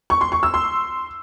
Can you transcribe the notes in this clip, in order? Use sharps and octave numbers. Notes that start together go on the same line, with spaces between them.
C#6
C6
C#6
E6
C6